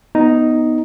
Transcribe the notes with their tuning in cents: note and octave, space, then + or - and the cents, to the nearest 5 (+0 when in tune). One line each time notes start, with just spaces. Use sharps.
B3 +0 D#4 +0